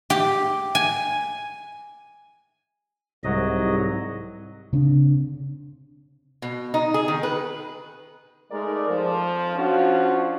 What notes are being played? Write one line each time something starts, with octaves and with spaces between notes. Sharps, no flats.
G4
G#5
C2 G#2 F#3 D#5
C#3 C4 D4
B2
D#4
G#4
D#3
B4
G#3 A3 D#4 A#4 D5
F2 F3
F3 C#4 D4 F4 F#4